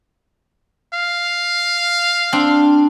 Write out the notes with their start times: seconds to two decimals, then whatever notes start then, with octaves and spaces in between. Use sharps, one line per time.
0.94 F5
2.33 C4 D4